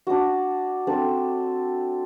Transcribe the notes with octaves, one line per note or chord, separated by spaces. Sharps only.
D4 F#4
C4 D4 A4